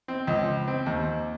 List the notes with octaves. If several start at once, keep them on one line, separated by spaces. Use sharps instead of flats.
C4
C#2
C4
D#2